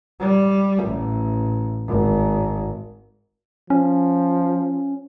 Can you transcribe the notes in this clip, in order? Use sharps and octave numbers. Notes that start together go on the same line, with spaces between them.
G3
A1
G#1
F3 C#4